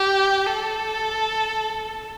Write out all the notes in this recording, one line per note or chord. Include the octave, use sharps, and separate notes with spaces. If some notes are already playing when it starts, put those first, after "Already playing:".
Already playing: G4
A4